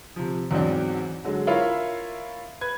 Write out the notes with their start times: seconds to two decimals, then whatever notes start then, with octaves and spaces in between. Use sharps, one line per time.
0.16 C3 F3
0.51 E2 G#2 F#3 C4 D4
1.24 D3 F#3 G#3
1.47 E4 F4 A#4 C#5 E5 F5
2.61 B4 G#6